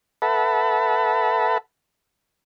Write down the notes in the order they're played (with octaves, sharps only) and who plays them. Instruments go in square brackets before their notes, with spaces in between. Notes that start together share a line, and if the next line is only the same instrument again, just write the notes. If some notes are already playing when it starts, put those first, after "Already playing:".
[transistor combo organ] A4 B4 E5 F#5 A5 B5